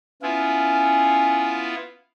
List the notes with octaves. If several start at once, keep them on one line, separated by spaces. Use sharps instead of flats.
B3 C#4 E4 F4